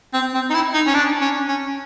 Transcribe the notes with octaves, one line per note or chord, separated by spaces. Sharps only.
C4
C4
D#4
E4
D#4
C#4
D4
C#4
C#4